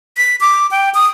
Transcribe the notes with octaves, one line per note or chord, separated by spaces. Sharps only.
B6
D6
G5
D#6